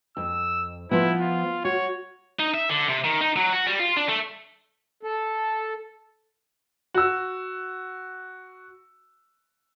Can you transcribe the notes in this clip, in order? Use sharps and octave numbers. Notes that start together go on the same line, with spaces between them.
F2 E6
F3 B3 E4
F4
F#4 C#5
D#4
E5
D3
C3
D#3
D#4
F#3
F#4
G3
F4
D4
A3
A4
F#4 E6